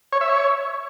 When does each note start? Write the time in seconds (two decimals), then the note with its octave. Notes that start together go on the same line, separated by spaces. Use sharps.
0.13 C#5
0.21 E5
0.29 C#5